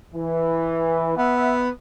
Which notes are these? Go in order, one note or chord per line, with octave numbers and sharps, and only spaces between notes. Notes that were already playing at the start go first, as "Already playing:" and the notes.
E3
B3 E5 F#5